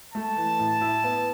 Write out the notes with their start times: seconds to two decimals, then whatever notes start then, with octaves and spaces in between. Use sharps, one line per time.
0.14 A3 A5
0.36 E3
0.59 A2
0.81 E4
1.04 B3